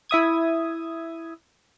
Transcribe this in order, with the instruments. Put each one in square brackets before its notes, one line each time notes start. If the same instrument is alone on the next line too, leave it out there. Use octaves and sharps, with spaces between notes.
[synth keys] E4 E5 D#6 G#6